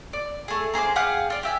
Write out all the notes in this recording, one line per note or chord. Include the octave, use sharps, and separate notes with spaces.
D5
A3 G#4
A#3 G#4 C5 D6
G4 G#4 F5 F#5
F4 D5
G4 E5 G#5